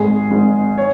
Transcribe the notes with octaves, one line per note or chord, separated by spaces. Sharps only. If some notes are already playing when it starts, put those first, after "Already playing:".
Already playing: G#1 G#2 G#3 G#4
G#1 G#2 G#3
C#5